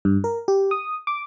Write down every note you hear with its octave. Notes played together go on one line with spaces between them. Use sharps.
G2
A#4
G4
D#6
D6